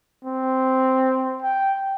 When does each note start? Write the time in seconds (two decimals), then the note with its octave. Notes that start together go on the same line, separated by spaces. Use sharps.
0.25 C4
1.42 G5